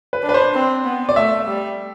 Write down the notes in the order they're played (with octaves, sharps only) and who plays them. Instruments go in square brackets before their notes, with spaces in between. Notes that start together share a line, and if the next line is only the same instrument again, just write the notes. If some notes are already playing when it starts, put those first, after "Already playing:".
[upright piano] B4
[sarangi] D4
[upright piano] B4
C5
[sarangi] C4
B3
[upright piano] D5
[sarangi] A3 [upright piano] E5
[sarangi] G3